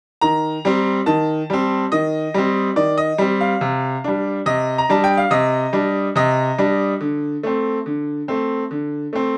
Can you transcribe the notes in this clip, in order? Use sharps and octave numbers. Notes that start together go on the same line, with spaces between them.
D#3 A#5
G3 C4
D#3 A5
G3 C4
D#3 D#5
G3 C4
D#3 D5
D#5
G3 C4
F5
C3
G3 D4
C3 D#5
A#5
G3 D4 A5
G5
F5
C3 D#5
G3 D4
C3 D#5
G3 D4
D3
A3 C4
D3
A3 C4
D3
A3 C4